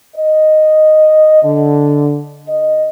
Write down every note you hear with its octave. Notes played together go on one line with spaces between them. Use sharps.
D#5
D3
D#5